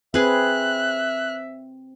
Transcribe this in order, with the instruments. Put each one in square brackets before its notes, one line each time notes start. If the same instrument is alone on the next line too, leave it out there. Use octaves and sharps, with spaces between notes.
[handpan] C4 [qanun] G#4 B4 [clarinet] E5 [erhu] F#6